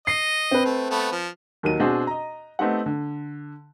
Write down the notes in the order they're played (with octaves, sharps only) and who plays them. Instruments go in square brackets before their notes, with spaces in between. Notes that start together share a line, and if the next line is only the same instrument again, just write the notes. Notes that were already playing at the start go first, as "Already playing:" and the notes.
[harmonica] D#5 [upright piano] C7
[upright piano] C4 B4
[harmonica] A3
A3 B3
F3
[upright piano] D#2 D#3 F#3 D#7
B2 C4 D4 F#4 G#4
D#5 A#5
A3 B3 C4 D#4 G4 F#5
D3